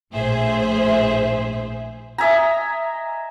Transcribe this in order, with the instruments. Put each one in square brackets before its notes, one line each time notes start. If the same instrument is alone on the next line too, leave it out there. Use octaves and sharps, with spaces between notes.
[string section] A#1 A2 G#4 C5 E5
[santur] D#5 E5 G#5 A#5